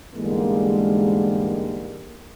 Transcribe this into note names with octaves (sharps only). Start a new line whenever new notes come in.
E2 G#2 D3 G3 G#3 A#3